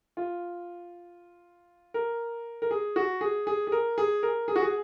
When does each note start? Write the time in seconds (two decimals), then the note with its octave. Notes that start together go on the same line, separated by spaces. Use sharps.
0.17 F4
1.94 A#4
2.62 A#4
2.71 G#4
2.96 F#4
3.21 G#4
3.47 G#4
3.67 G#4
3.72 A#4
3.98 G#4
4.23 A#4
4.48 G#4
4.56 F#4
4.62 G#4